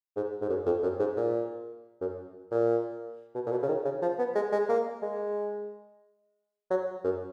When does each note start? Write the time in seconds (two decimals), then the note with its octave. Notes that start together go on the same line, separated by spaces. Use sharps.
0.16 G#2
0.41 G#2
0.50 F#2
0.66 F2
0.83 F#2
1.00 G#2
1.17 A#2
2.01 F#2
2.52 A#2
3.35 B2
3.47 A#2
3.51 B2
3.63 C#3
3.68 D#3
3.85 C#3
4.02 F3
4.19 B3
4.36 G#3
4.52 G#3
4.69 A#3
5.02 G#3
6.70 F#3
7.04 F#2